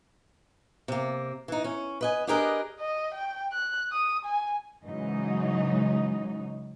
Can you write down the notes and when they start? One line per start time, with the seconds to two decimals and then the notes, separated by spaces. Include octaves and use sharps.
0.88 C3 A#3
1.48 E3 D#4
1.64 C#4
2.01 B4 D#5 G#5
2.27 D4 G4 G#4 A#4 B4 D#5
2.79 D#5
3.14 G5
3.52 F#6
3.92 D#6
4.25 G#5
4.85 G#2 C#3 E3 F#3 D#4